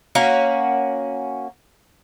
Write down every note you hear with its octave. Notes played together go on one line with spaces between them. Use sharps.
A#3 C#4 F#4